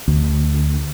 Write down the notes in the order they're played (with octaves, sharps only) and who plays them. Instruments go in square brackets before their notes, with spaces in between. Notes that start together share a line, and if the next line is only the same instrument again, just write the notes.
[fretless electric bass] D2